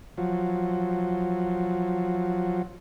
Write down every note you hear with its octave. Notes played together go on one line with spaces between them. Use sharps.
F3 F#3